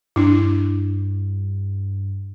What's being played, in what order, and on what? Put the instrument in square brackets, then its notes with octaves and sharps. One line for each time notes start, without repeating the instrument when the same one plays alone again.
[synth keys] G2 [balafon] D4 E4